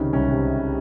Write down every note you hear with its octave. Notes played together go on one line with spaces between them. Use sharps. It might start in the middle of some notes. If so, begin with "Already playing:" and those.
Already playing: C#2 C3 D#3 C#4
C2 C#4
C3